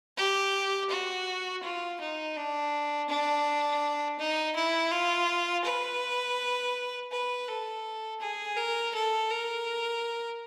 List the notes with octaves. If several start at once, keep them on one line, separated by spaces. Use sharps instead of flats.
G4
F#4
F4
D#4
D4
D4
D#4
E4
F4
B4
B4
A4
G#4
A#4
A4
A#4